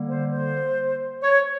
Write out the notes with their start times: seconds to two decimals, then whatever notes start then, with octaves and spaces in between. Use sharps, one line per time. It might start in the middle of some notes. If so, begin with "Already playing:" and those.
Already playing: D3 G3 A#3
0.10 C5
0.32 C5
1.23 C#5